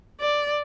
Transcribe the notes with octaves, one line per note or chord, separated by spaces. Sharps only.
D5